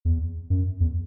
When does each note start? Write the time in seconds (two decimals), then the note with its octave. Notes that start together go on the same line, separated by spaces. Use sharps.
0.05 E2
0.50 F#2
0.80 E2